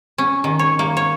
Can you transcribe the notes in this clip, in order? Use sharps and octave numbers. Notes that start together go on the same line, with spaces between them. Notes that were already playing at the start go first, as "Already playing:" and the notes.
C#4
D#3
C#5
A#3
C#5